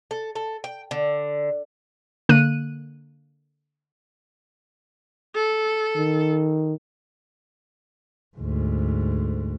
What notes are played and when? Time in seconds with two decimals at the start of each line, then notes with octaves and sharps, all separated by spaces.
0.11 A4
0.35 A4
0.64 G5
0.91 D3
2.29 D3 A#3 F#6 D#7
5.35 A4
5.96 D#3
8.37 D2 G#2